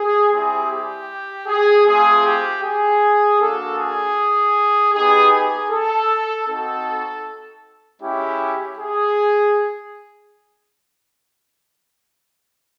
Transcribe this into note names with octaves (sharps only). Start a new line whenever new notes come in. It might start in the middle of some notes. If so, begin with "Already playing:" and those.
Already playing: G#4
G3 C4 E4 G4 G#4
G4
G#4
A3 C4 F4 G#4
G4
G#4
A#3 D4 F#4 A4
G#4
B3 D#4 G4 G#4
G#4
A4
C4 D#4 F#4 A4
G#3 C#4 E4 G4
G#4